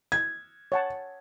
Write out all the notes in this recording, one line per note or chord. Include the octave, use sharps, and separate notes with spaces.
G#6
C#5 F#5 A5